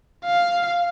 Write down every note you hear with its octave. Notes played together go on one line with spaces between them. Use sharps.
F5